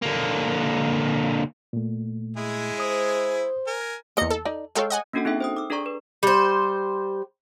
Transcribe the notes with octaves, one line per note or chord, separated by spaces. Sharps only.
D3 A#3
A#2 A3
G#3 E4 G#4
C5 D#6
A#4 G#5
E2 A#3 A#4 D#5 C#7
A4
D#4 D5
G#3 A4 A#4 C#5 F5 G5
D#5 F#5 G#5
A#3 C#4 D4 F#4 A4 F#5
C4 D#4 G#4 A4 E5 G5
C5 G5 D#6
D6 E6
D4 G#4 A4 D5 A#5 C#6
B4
G3 C5